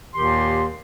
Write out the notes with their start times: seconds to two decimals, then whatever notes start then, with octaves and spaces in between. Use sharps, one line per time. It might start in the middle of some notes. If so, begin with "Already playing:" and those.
0.14 D#2 A#2 D#3 G4 C6